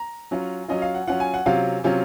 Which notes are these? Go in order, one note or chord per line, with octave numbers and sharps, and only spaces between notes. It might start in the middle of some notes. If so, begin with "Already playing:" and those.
Already playing: A#5
F#3 C#4 F4
F#3 C#4 F4 D#5
F5
F#5
F#3 C#4 F4 F#5
G#5
F#5
C3 F#3 C#4 F4 F5
C3 F#3 C#4 F4